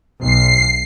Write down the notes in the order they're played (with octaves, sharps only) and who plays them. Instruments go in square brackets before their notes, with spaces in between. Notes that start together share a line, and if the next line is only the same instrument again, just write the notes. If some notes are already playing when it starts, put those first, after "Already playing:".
[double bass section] B1 [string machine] C7